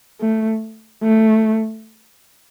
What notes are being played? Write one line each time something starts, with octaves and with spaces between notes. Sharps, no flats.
A3
A3